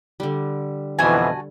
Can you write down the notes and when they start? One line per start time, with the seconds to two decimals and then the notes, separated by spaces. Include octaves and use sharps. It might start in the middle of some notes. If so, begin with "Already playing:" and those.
0.20 D3 G3
0.99 F2 B2 E3 A3 F#4 G#5